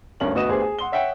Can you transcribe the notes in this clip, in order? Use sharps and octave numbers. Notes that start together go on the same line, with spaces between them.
D2 G2 C#4 A#4 F#7
D2 B3 F#4 D#5 D#6 E7
D2 B3 G4 G#4 C5
G#4
F#5 C6 G7
C#5 E5 F#5 G5